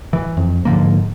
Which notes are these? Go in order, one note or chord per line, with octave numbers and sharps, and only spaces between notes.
E3
F2
G#2 D3 F3 A#3